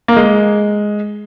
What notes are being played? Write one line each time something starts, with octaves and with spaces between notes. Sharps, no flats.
A#3
G#3